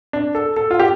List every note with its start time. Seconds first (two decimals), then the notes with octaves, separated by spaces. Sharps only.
0.13 D4
0.35 A4
0.56 A4
0.71 F4
0.79 G4